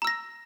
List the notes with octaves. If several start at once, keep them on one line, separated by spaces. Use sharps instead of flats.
A#5 E6 A#6